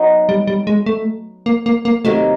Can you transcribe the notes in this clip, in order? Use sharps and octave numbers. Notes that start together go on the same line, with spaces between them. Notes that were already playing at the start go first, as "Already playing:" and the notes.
Already playing: F#3 B3 D#4 F#4
G3
G3
G#3
A3
A#3
A#3
A#3
C3 D#3 F#3 A3 A#3